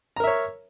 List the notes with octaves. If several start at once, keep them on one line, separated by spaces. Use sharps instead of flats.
A#4 C#5 E5 A#5